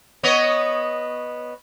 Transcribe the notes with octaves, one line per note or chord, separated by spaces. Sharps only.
B3 C#5 D#5